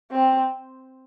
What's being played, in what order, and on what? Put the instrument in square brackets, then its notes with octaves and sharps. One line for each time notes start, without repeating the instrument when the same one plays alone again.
[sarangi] C4